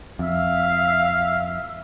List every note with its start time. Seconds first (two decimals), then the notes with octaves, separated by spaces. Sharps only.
0.19 F2 E5 F5 E6